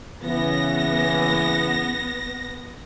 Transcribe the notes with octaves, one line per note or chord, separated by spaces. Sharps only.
C#3 E3 B3 A#6